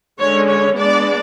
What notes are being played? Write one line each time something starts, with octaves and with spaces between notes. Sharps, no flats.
D3 G#3 C#4 C#5
C#5
G#3 B3 D4 D5